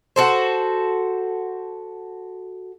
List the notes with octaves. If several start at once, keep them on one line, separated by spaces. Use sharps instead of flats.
F#4 A4 C5